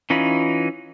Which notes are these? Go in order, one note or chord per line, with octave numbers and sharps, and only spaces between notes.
E3 C#4 D#4 F4 B5